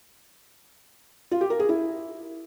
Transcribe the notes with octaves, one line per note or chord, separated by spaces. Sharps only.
F4
G4
A#4
G#4
E4